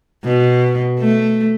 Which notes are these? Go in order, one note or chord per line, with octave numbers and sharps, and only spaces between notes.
B2
A3